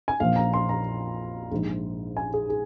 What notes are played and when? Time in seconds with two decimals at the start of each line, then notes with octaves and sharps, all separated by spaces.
0.08 G#5
0.20 A#1 A#2 F3 F5
0.36 A#5
0.53 C6
0.69 A#5
1.51 A#1 G#2 F3
2.17 G#5
2.34 G#4
2.49 G#4